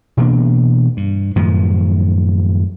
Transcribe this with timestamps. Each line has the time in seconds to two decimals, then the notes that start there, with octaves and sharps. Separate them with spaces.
0.17 B2 E3 A#3 D4
0.97 G2
1.36 F#2 A2 D#3 F3